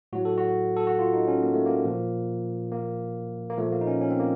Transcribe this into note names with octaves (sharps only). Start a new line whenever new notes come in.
A2 F#3 F#4
A4
F#4
A4
F#4
F4
D#4
C#4
A#3
A3
A#3
A#2 F3
A#3
A#3
A#2 F3 A3
A#3
D#4
C#4
C#4
C4
A#3